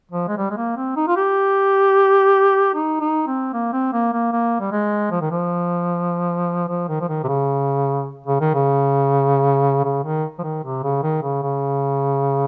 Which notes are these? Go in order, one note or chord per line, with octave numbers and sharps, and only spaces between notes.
F3
G#3
G3
G#3
A#3
C4
D#4
F4
G4
D#4
D#4
C4
A#3
C4
A#3
A#3
A#3
G3
G#3
F3
D#3
F3
F3
D#3
F3
D#3
C3
C#3
C#3
D#3
C#3
C#3
D#3
F3
D#3
C3
C#3
D#3
C#3
C#3